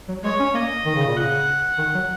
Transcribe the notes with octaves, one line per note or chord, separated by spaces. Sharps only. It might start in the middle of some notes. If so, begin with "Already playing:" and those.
F#3
G#3 C#5
C#4
A#3 D#5
D#3
C#3
A#2
C#3 F#5
D#3
F#3